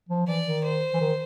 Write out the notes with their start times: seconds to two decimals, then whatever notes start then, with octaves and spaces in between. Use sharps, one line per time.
0.09 F3
0.27 E3 D5
0.45 D#3
0.64 C5
0.93 E3
1.00 D#3